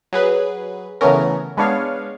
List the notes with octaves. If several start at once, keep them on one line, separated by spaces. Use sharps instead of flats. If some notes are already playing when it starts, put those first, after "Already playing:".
F#3 G#4 B4
C#3 E3 A3 B3 C#4 A#4
G#3 B3 D4 C#5 F5